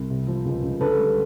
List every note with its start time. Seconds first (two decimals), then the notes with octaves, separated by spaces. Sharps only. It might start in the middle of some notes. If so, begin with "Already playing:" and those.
Already playing: C2
0.10 C3
0.27 F3
0.45 C#2
0.63 C#2
0.81 D3 A4 B4
0.98 G3